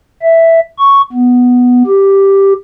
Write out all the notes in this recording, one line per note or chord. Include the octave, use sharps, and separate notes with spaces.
E5
C#6
B3
G4